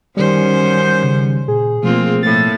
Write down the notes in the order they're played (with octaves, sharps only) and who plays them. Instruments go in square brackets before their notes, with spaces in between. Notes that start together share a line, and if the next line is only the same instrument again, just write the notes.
[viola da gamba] F#2 C#4 C5 [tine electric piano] D#3 G3
[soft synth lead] G6
C#3
[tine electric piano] A#2 [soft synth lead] G#4
[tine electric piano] B2 F3 A3 [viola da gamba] A#3 C4 F4
[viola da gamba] A2 A#3 [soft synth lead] A6